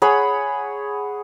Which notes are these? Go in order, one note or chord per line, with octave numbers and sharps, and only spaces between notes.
G#4 C#5 F#5 B5